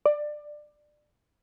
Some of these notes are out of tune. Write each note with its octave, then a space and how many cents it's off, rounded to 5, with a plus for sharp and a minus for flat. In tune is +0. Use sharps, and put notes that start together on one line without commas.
D5 +20